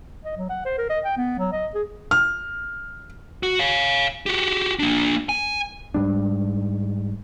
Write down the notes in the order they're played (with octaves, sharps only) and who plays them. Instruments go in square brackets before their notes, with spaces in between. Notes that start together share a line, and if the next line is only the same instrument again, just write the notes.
[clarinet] D#5
F#3
F#5
C5
A#4
D#5
G5
B3
F#3
D#5
G#4
[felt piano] F6
[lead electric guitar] F#4
C#5 F5
F#4 G4
A#3 D4
G#5
[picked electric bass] G#2 G3 D4